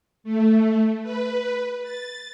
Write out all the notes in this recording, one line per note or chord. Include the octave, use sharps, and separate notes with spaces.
A3
B4
A6